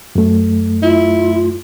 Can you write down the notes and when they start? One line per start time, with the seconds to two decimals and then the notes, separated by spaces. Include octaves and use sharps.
0.15 F#2 A3
0.83 E4 F4